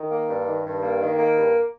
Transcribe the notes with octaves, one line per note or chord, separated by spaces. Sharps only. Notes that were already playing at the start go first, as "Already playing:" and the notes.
Already playing: D#3
A#3
G2
D#3
G2
A#3
D#3
A#3
G2